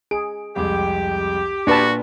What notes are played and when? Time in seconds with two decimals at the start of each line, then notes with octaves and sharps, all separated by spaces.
0.11 G#4 D7
0.56 C2 F2 G#3 G4
1.67 A#2 D4 F#4 B4 A5